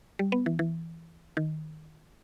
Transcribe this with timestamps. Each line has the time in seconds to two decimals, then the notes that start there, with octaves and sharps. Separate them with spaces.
0.19 G3
0.32 B3
0.46 E3
0.59 E3
1.37 D#3